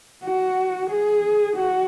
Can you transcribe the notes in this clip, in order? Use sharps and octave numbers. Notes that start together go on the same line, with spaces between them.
F#4
G#4
F#4